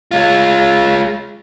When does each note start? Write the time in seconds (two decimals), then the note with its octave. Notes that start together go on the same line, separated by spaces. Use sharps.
0.11 G#3 F4